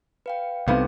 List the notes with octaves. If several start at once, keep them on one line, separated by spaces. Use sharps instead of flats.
B4 F5 G5
C2 C3 B3 D#4 A4 F5 D6